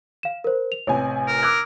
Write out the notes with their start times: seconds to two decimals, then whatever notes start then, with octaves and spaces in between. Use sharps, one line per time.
0.23 F5 E7
0.44 A#4 C5
0.72 F7
0.87 A1 C3 C#5 G#5
1.27 A#4
1.43 D6 E6 F#6 G#6